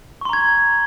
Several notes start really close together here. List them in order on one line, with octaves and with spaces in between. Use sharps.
C#6 C6 A#5 G#6